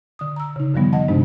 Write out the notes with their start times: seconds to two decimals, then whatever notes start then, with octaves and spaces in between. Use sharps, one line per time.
0.19 D3 D#6
0.36 A#5 E6
0.56 C#3 D#4
0.74 F#2 D3 D#3 F3 G3 B3
0.93 D#5 F#5 A5
1.08 G2 C3 G#3 D4 D#4